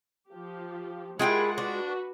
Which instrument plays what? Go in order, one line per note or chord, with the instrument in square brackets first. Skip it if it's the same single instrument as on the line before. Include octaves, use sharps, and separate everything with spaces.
[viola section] F3 G4
[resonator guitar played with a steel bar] G#3 F4 G5 [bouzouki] E4 G#4 [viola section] G4 A#4 F#5
[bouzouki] D4 [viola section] F#4 B4